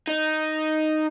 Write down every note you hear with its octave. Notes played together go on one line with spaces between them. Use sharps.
D#4